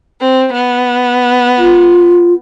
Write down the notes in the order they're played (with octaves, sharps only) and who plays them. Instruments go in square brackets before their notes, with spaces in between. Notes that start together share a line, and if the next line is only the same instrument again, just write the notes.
[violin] C4
B3
[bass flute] F4